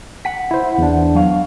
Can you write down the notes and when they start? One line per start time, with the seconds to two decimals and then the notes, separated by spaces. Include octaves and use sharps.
0.25 F#5 B6
0.51 E4 C5
0.78 E2 D4
1.15 F#3 F5